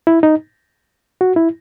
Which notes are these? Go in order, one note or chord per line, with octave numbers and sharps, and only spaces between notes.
E4
D#4
F#4
E4